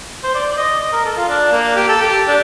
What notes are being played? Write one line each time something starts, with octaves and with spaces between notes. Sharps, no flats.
C5
D5
D5
D#5
D#5
A#4
A4
F4
D4
A#3
G4
A4
G4
D4